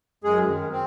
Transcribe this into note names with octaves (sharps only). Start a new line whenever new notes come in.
F#2 G#3 G#4
D#3
C4